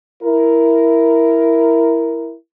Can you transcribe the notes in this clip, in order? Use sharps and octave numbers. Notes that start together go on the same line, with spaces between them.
E4 A#4